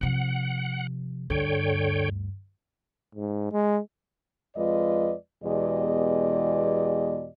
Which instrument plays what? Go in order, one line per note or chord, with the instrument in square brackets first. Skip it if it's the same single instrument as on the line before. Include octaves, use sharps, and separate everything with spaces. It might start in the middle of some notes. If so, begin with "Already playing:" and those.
[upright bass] C3 F3 [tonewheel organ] F#5
[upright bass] D2 G2 [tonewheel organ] D3 C#5 G5
[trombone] G#2
G#3
[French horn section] F2 G#3 F4 B4 D5 D#5
E2 B2 G#3 G4 D5 D#5